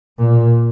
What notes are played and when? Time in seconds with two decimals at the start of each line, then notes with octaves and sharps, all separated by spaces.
0.18 A#2